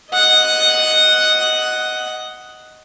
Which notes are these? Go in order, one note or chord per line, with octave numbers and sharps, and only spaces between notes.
D#5 F#5